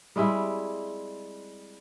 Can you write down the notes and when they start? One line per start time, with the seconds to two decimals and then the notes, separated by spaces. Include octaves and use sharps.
0.16 G3 G#3 C4 E4